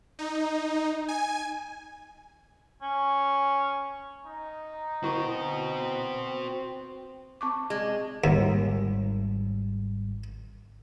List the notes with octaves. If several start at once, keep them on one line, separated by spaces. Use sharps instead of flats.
D#4
G#5
C#4
D#4
D3 C4 E4 F#4 B4 C#6
C4 C#6 D6
G#3
G#1 D#2 G3